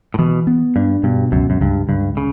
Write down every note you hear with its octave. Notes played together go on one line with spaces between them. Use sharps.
A2
B2 E3
B3
G2 D4
G2 B2
C#2 F#2
F#2
C#2 G2
C#2 G2
C#3